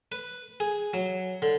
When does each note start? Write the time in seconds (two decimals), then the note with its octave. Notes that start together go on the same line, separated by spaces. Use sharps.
0.12 B4
0.60 G#4
0.94 F#3
1.42 D3